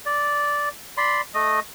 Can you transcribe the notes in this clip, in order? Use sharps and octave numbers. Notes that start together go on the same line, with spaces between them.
D5
D5 B5 C6
A3 D#5